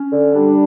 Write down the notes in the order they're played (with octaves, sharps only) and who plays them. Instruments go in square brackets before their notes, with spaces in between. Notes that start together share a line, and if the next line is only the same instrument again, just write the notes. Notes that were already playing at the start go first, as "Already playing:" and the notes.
Already playing: [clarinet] C#4
[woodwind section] D3
[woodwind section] G3 [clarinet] D4